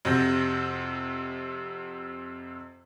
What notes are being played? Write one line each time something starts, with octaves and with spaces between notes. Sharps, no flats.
F2 C3 F#4 G6 A#6